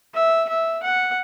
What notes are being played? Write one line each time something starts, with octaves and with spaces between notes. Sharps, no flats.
E5
E5
F#5